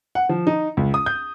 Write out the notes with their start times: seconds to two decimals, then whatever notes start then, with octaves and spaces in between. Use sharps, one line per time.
0.15 F#5
0.29 F3
0.47 D#4
0.77 C#2
0.94 D#6
1.06 G6